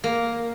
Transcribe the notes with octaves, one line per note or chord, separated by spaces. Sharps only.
A#3